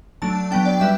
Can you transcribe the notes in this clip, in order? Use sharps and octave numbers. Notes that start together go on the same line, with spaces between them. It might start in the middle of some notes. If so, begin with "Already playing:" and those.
F#3 A3 D4 A5
F#3 B3 D4 G5
D5
G3 B3 E5